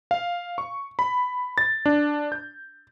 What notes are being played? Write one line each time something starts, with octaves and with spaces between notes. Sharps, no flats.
F5
C#6
B5
A6
D4
G6